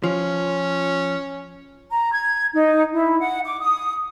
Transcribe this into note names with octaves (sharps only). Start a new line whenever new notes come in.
F3 C#4
A#5
G#6
D#4
E4
F#5
D6
D#6